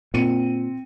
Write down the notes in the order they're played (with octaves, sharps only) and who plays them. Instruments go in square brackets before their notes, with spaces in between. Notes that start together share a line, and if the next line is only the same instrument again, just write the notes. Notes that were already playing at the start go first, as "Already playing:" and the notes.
[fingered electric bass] A#2 [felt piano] C4 C#7 D#7